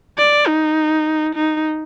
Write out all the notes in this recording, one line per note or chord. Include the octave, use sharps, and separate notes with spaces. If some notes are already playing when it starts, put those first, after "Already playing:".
D5
D#4
D#4